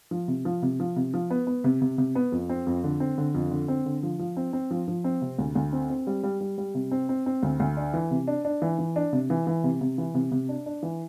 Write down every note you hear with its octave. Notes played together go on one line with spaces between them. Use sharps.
F3
C3
F3
C3
F3
C3
F3
B3
B3
C3
C3
C3
B3
F2
C4
F2
D3
C4
D3
F2
D3
C4
D3
F3
F3
C4
C4
F3
F3
C4
C3
D2
D2
C4
C4
G3
G3
G3
G3
C3
C4
C4
C4
D2
D2
D4
E3
C3
D4
D4
E3
E3
D4
C3
E3
E3
C3
C3
E3
C3
C3
D4
D4
E3